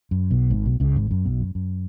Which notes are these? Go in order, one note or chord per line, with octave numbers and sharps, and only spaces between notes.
F#2
B1 B2
G#1 G#2
B1 B2
C#2 C#3
G#1 G#2
F#2
B1 B2
F#2
F#2